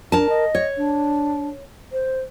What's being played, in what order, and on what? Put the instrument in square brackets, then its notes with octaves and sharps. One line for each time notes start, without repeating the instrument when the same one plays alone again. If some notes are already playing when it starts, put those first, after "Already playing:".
[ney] D4 [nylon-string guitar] A#4 A5
[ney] D#5
[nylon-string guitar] C#5
[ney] D4
C5